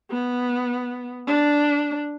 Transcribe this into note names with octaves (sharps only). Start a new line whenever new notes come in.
B3
D4